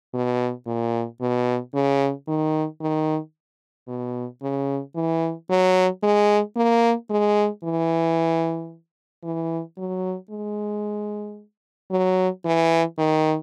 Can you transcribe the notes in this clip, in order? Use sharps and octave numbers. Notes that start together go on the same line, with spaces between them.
B2
A#2
B2
C#3
D#3
D#3
B2
C#3
E3
F#3
G#3
A#3
G#3
E3
E3
F#3
G#3
F#3
E3
D#3